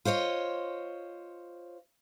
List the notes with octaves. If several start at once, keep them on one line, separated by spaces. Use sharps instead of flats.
F4 C5 C#5 D#5